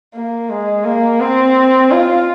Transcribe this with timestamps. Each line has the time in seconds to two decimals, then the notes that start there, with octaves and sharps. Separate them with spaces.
0.14 A#3
0.50 G#3
0.85 A#3
1.21 C4
1.92 F4